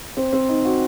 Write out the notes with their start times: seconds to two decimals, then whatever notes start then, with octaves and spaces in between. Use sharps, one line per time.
0.17 C4
0.33 C4
0.49 D#4
0.65 F#4